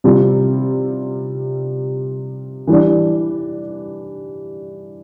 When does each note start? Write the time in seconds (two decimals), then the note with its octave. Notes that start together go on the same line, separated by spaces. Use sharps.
0.04 C3 G3 C4 F4
2.67 E3 G3 D4